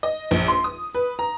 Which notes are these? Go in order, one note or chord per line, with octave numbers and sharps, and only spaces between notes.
D#5
A#1
C6
D#6
B4
A#5